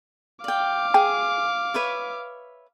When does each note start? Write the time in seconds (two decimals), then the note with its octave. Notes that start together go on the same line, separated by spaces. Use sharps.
0.44 D5 F5 G5 D6
0.94 G#4 G5
1.74 B4 C#5 E5